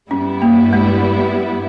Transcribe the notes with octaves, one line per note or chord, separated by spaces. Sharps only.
G2 G3 B3 C#4 E4
A#3
G#3